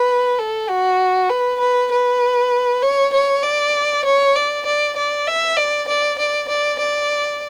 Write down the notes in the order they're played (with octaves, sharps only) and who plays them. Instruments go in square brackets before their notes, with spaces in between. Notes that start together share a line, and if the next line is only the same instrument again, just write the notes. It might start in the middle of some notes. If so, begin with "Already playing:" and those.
Already playing: [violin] B4
A4
F#4
B4
B4
B4
C#5
C#5
D5
C#5
D5
D5
D5
E5
D5
D5
D5
D5
D5